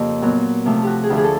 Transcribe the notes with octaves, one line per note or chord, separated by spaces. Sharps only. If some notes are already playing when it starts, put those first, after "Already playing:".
Already playing: F2 C#3 A#3 G4
A#2 F#3 B3
C3 F3 A3
F#4 G4
G#4
D2 D3 F3 G4
G#4
A4